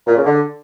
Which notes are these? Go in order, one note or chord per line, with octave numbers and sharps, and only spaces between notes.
A#2
C#3
D3